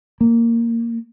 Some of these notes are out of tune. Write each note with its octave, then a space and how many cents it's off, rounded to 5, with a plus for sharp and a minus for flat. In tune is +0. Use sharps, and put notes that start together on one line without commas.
A#3 -10